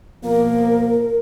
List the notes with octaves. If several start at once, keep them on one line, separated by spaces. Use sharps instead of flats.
B2 F3 A#3 A#4